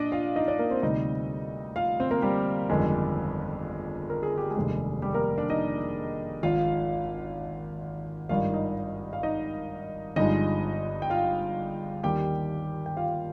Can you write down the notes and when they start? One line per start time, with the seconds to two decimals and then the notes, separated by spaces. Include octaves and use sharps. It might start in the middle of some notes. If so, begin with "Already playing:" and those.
Already playing: A#2 D4 D5 D#5
0.12 F4 F5
0.36 D#4 D#5
0.47 D4 D5
0.59 A#3 A#4
0.71 C4 C5
0.82 D2 C3 G3 D#4 D#5
1.76 F4 F5
2.00 C4 C5
2.11 A#3 A#4
2.22 G3 G4
2.69 G1 F2 D#3 G#3
4.10 A#4
4.23 G#4
4.38 G4
4.51 G#3 G#4
4.57 F1 D#2 D3 G3
5.02 G3 G4
5.14 A#3 A#4
5.38 D4 D5
5.50 D#4 D#5
6.43 G#1 G#2 F3 F4 F5
8.29 G#1 G2 D#3 G3 F4 F5
8.53 D#4 D#5
9.13 F5
9.23 D#4 D#5
10.16 G1 G2 F3 G#3 D#4 D#5
11.02 G5
11.10 F4 F5
12.03 D#2 D#3 G3 G4 G5
12.86 G5
12.97 F4 F5